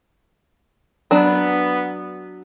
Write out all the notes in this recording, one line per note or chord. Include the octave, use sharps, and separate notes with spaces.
F#3 B3 D4